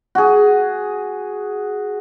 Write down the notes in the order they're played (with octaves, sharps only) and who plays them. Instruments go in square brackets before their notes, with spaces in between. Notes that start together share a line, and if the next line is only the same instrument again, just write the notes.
[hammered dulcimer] F#4 G#4